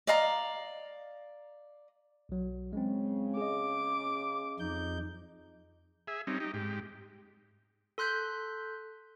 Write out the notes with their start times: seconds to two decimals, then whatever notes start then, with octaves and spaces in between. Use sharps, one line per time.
0.07 D5 D#5 F5 A#5
2.29 B1 F#3
2.73 C#3 G#3 C4
3.37 G#4 D#5 D6
4.59 F2 D#4 G6
6.08 G#4 E5
6.27 G3 C4 C#4 D#4
6.40 D#4 G4
6.54 G#2 G4
7.98 A4 C6 F#6 G6 B6